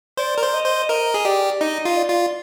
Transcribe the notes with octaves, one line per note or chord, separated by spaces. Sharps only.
C5 D5
A#4
C5
D#5
C5
A#4 D#5
G#4
G4 D5
D#4 D#5
F4
D5
F4